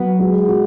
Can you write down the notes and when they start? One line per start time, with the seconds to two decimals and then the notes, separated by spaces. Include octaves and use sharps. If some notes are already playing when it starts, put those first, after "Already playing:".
Already playing: F#3 B3
0.19 G#3 F#4
0.48 F#4